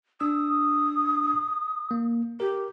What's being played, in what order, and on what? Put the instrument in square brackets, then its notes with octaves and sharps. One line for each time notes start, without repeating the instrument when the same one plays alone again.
[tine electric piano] D4 E6 [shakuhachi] D#6
[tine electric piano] A#3
[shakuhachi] G4 [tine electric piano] A#4